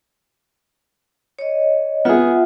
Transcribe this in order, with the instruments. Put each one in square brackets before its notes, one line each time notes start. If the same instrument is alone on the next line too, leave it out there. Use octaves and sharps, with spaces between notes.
[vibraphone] C#5 D#5
[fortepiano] B3 G#4 [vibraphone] F4 E5 F#5